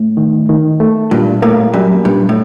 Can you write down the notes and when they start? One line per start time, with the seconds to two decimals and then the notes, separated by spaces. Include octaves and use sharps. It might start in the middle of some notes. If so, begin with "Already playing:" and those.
Already playing: A2
0.17 D#3
0.49 D#3
0.80 A3
1.11 G2 A#2
1.42 A2 A#3
1.73 F#2 G3
2.05 G2 A#2
2.29 A2